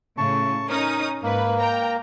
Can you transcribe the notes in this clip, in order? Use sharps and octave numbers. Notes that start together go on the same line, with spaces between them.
A2 C#3 A5 C#6
C#4 D#4 A#4 D#6
G#2 A#3 B4
G5 A#5